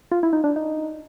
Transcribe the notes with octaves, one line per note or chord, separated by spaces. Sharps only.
F4
E4
D#4
D4
D#4